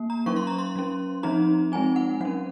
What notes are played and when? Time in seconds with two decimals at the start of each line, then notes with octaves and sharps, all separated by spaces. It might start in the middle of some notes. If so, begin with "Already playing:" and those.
Already playing: A#3
0.10 A#5
0.26 F#3 C#4 C#6
0.36 C6
0.47 A#5
0.59 C6
0.76 F#3 C#4
1.23 F3 C4 D#4 A#5
1.72 G#3 C4 D#4 G#5
1.96 F#5
2.21 F#3 C#4 F#5